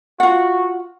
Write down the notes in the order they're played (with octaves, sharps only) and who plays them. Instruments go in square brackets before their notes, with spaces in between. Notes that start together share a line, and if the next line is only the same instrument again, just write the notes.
[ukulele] F4 F#5 [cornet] F#4